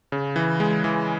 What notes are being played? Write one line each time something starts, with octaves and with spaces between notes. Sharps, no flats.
C#3
E3
G#3
E3